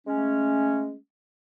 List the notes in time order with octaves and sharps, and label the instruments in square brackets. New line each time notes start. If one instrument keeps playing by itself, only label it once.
[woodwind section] G#3 A3 C#4